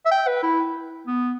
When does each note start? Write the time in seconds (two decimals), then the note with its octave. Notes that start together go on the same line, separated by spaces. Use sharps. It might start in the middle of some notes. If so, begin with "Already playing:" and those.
0.06 E5
0.12 G5
0.27 B4
0.43 E4
1.07 B3